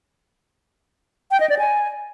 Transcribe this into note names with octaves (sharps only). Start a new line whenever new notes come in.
G5
D#5
D5
G#5